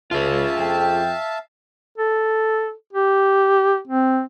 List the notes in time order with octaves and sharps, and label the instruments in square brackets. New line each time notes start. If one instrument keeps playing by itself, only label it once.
[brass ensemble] C#2 [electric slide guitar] F4 G#4 [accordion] E5 F5 A5
[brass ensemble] F2 G5
[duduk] A4
G4
C4